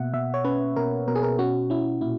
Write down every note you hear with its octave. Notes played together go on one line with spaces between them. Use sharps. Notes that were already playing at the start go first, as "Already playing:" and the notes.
Already playing: B2 A#3 E5 F#5
B2 E5
C#5
C#4 B4
B2 A#4
B2 A#4
G#4
A#4
C#4 F#4
C#4 E4
A#2 E4